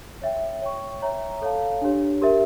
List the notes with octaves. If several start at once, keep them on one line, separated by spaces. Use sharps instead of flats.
C#5 E5 G5
C#5 G5 C#6
C#5 E5 G5 A#5
A4 C#5 F5 A5
D4 G4 C#5
G4 A#4 E5